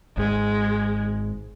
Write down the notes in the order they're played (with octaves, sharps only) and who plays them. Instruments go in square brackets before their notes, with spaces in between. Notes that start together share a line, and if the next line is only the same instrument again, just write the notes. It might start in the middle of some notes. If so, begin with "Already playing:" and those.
[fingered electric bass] G#1 G#2 [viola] G#3